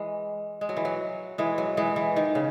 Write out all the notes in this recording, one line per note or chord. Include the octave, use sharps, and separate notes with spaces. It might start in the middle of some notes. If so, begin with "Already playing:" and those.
Already playing: E3 G#3
G#3
F#3
E3
F#3
E3 G#3
F#3
E3 G#3
E3
D#3
C#3